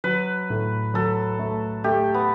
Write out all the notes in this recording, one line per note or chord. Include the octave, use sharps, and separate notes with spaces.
F#3 B4
A2
F#3 A4
A3
A3 G4
B3